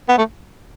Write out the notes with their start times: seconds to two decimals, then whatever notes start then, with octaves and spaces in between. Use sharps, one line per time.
0.09 B3
0.18 A3